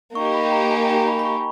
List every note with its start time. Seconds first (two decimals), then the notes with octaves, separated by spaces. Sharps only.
0.15 A#3 D#4 G4 C#6
0.25 C#6
0.34 B5
0.52 A#5
0.71 G#5
0.90 A#5
1.08 B5
1.19 B5
1.25 C#6